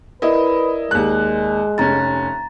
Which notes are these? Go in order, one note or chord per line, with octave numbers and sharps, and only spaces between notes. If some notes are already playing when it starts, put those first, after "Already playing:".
E4 A#4 B4 D5 D#5
D#2 G#3 F#6
F1 C#4 A#5 A6